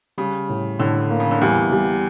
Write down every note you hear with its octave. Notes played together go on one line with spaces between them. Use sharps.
C#3 G3
A2
A2 D3
A#3
C#3
D3
E2 E3 G3
G3